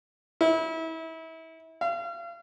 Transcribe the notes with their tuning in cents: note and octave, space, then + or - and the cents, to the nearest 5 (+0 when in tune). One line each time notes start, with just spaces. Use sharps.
E4 -30
F5 -35